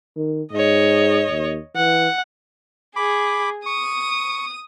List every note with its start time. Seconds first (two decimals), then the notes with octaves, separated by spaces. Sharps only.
0.16 D#3
0.52 G#2 C#5 D#5
1.31 D#2
1.76 E3 F#5
2.96 G#4 B5 D6
3.66 C#6 D#6